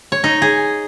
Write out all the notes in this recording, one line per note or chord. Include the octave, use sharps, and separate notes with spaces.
C#5
D#4
G#4